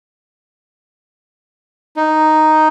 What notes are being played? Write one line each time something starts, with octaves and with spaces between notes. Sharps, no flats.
D#4